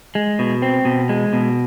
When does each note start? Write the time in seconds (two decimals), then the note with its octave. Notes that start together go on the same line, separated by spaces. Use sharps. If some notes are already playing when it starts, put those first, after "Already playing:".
0.15 G#3
0.39 B2
0.62 C4
0.85 B2
1.09 G#3
1.33 B2